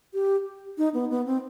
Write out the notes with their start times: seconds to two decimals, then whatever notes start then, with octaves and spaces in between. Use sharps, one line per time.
0.14 G4
0.78 D#4
0.94 B3
1.10 B3
1.26 C4